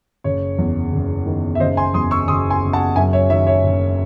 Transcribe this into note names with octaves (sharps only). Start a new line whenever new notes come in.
F#1 C#5
E2
F#1
D#3
E5
F#1 C5 D#5
G#5 C6
E2 C6 D#6
C#6 E6
F#1 C6 D#6
G#5 C6
F#1
F#5 A5
F#2 E5 G#5
C#5 E5
D#3 C#5 E5
C#5 E5
F#1